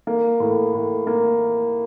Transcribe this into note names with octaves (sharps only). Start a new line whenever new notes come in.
A#3
A2
A2
A#3